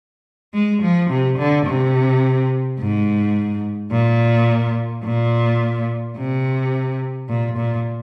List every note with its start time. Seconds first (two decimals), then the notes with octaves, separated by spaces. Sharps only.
0.54 G#3
0.82 F3
1.10 C3
1.38 D3
1.66 C3
2.79 G#2
3.92 A#2
5.04 A#2
6.17 C3
7.29 A#2
7.57 A#2